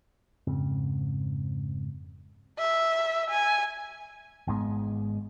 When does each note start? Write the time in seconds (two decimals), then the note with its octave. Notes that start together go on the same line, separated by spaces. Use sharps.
0.47 F2 G#2 C#3 C4
2.59 E5
3.30 G#5
4.47 G#1 G#2 G#3 B3